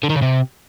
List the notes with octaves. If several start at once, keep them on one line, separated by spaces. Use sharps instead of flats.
D3
D#3
C#3
C3